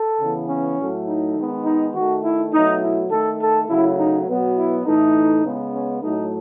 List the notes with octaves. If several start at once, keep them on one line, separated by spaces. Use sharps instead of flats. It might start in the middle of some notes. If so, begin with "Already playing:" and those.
Already playing: A4
C#3 E3 B3
C#4
A2 F#3 A3
D#4
D#3 G#3 B3
D#4
D#3 A3 F#4
E4
B2 F#3 A3 D#4
E4
D#3 A3 A4
A4
C#3 F#3 A3 E4
D#4
B2 F#3 B3
E4
A2 E3 A3 D#4
C#3 G#3 B3
C#4
A2 F#3 A3 D#4